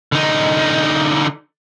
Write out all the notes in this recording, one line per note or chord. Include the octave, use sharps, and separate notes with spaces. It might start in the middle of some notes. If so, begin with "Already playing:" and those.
D3 D#4